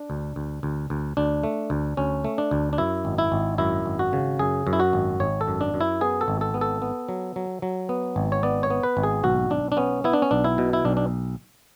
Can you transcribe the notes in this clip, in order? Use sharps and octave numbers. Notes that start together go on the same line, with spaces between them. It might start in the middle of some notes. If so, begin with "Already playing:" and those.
Already playing: D4
D2
D2
D2
D2
D2 D4
A3
D2
D2 C#4
A3
D4
D2
D4
F#2 E4
G#1
E4
G#1
F#2 E4
G#1
F#4
C#3
F#2 G#4
F#2
E4
F#4
G#1
G#1 C#5
A4
F#2
D4
F#2
E4
B3 G#4
A4
G#1
A4
B3
A4
B3
F#3
F#3
F#3
B3
G#1
C#5
B3 D5
C#5
B3
B4
G#1
G#4
B1 F#4
B1 D4
D4
B3 C#4
B3 E4
D4
C#4
B1 D4
E4
B2
E4
B1 D4
D4